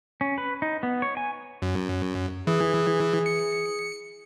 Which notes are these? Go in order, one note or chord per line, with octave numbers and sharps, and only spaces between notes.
C#4
B4
D#4
B3
C#5
G#5
F#2
E3 G#4
C#7